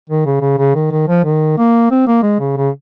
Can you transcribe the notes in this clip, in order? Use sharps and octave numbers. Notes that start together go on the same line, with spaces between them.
D#3
C#3
C#3
C#3
D#3
D#3
F3
D#3
A#3
C4
A#3
G#3
C#3
C#3